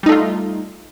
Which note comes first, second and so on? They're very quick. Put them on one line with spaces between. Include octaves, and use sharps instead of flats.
G3 D#4 A3 F4